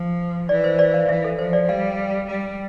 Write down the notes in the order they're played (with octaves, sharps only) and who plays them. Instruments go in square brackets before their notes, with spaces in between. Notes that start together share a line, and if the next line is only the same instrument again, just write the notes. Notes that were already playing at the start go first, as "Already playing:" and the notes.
Already playing: [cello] F3
[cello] E3 [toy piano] D5
[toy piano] C5
D5
F5
[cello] E3 [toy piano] E5
[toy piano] A4
[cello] F3 [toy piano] C5
[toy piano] D5
[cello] G3 [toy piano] F5
[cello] G3